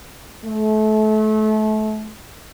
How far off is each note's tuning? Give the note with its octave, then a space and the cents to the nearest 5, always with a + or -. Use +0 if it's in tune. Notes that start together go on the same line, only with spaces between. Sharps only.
A3 -30